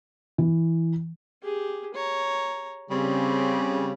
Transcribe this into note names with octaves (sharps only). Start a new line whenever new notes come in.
E3
G4 G#4
C#5 A#5
C#3 G3 C4